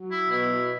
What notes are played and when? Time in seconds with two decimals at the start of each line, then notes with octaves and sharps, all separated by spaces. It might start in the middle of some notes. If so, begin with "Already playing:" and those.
Already playing: F#3
0.11 E4
0.31 B2 E4